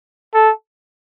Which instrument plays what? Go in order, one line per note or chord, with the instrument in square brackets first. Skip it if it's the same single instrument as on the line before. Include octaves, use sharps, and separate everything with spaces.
[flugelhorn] A4